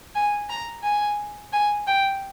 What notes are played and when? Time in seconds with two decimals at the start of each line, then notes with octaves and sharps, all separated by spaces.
0.16 G#5
0.50 A#5
0.84 G#5
1.53 G#5
1.87 G5